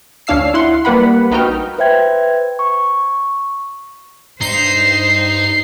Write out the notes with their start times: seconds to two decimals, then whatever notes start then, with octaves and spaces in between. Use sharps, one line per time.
0.27 D2 C#4 D4 F5 E6 C7
0.54 E4 F#5 C6
0.85 G3 A#3 B4 F#5 B5
1.31 A#1 B3 D#4 F#4 G5 F6
1.79 B4 C5 E5 G5 G#6
2.59 C#6
4.41 G2 D#4 C5 C7